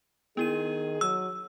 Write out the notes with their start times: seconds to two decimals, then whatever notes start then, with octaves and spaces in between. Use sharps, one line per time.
0.37 D#3 B3 E4 G#4 D#7
1.01 F#3 E6